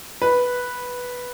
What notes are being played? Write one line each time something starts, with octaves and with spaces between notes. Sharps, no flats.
B4